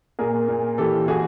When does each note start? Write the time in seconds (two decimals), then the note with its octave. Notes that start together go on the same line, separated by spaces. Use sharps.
0.19 A#2 G#4 A#4
0.48 A#2
0.78 E3 G4 A4
1.08 E3 F#4 G#4